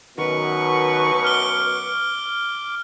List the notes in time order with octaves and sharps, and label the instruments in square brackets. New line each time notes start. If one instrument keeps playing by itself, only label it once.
[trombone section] F#2 B2 [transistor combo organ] D#3 F#4 A#4 [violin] B4 C#6
[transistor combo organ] D6 [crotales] F6 G7